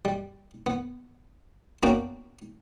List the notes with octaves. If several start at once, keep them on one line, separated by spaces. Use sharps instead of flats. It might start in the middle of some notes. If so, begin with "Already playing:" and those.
G3
B3
A#3 B3 C#4 D4 F#4 G5